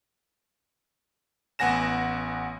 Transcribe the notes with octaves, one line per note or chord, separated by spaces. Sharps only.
A1 B3 F#5 G#5 A#6 E7